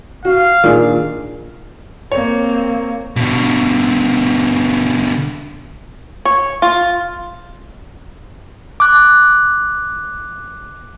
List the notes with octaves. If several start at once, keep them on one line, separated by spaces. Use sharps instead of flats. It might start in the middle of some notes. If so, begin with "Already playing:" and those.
F#4 F5
A#2 D#3 D4 G#4
A#3 C4 C#5
B2 D3
C#5
F4
D6 F#6